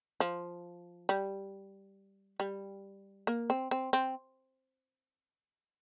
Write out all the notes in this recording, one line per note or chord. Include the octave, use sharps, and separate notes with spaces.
F3
G3
G3
A#3
C4
C4
C4